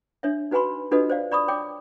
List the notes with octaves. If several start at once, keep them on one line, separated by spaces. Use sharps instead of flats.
D4 C#5 E5
D#4 F#4 B4 G#5 B5 C6
D4 F4 F#4 A4 B4 D#5
C5 D5 F5
D5 B5 C#6 D#6
C#5 G5 D6